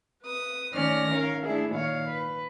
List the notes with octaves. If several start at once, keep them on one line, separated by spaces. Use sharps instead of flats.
B4 D#6
D#3 A3 C#4 D5 F6 A#6
C#4 A#4 F5
A3 D4 E4 G#4
A#2 D#3 C#5 F5
B4